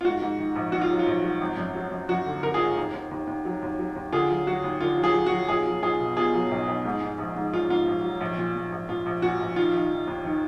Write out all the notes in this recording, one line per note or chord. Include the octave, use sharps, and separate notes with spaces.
F4
G#2 F#4
G#2
D#3
A#1
D#3 F#4
F4
F#3
F4
A#1
F#3
G#1
F#2
F#3
F#2
F#2 F#4
D3
D3 A#4
F4 G#4
G#1
D#2
D#2
D#2
D#2
F#3
D#2
F#3
D#2
D3 F4 G#4
F#3
F#3 F#4
D#2
D3 F4
F#3
F4 G#4
F#3
F#4
F#3
B1 F4 G#4
F#3
B1 F4 G#4
B2
B2 F4 G#4
F#3
B1
B1
G#2
G#2
A#1
G#2
F#3 F4
G#2 F4
A#1
F#3
A#1
A#2
A#2
A#1
A#1 F4
A#1
A#2 F#4
A#1
D#3 F4
D#3
D#3
D#2
D#3